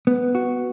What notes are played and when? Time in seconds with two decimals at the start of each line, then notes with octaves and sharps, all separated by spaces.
0.07 B3
0.35 F#4